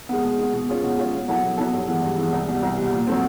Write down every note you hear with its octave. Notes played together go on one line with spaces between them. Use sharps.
G#3 B3
B2
G#3 B3
B2
G#3 C#4 F4 G#4
B2
G#3 C#4 F4 G#4
B2
F#3 B3 E4 A4
B2
F#3 B3 E4 A4
G2
E3 G#3 B3
G2
E3 G#3 B3
C2
B2 G3
C2
B2 G3
A#2
F#3 A3 C4